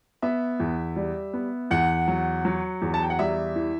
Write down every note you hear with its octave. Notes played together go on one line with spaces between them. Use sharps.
B3 E5
E2
G3
B3
E2 F#5
F#3
F#3
E2
A5
G5
F#5
G3 E5
E3